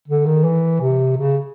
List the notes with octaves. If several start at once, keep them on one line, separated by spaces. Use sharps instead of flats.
D3
D#3
E3
C3
C#3